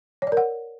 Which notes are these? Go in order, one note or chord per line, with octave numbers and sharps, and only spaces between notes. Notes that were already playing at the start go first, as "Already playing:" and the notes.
C#5
D5
A#4
F#5